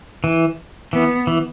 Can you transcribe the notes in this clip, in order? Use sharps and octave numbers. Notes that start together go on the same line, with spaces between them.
E3
E3 B3
E3